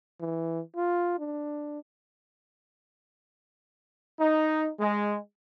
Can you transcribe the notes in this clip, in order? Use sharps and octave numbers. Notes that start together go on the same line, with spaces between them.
E3
F4
D4
D#4
G#3